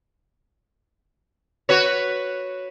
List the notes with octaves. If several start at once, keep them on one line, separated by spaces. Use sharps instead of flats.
F#4 B4 C#5